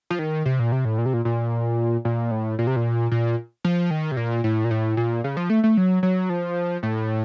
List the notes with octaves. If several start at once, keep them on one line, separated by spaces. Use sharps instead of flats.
F3
D#3
C3
A#2
C3
A2
A#2
C3
A#2
A#2
A#2
A2
A#2
C3
A#2
A#2
F3
D#3
C3
A#2
A2
A#2
A2
A#2
C#3
F3
A3
A3
F#3
F#3
F3
A2